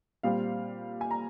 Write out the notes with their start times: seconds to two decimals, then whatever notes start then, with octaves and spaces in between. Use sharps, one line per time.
0.23 A#2 G3 C4 F5
1.01 G#5
1.11 A#5